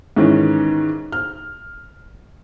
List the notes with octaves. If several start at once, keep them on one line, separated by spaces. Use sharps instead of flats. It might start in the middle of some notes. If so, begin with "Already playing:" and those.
G#2 D#3 E3 C#4
F6